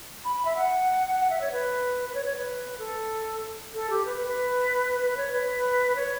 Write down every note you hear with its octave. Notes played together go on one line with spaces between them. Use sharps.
B5
B5
E5
F#5
F#5
E5
C#5
B4
B4
C#5
C#5
B4
A4
A4
G4
B4
B4
B4
B4
C#5
B4
C#5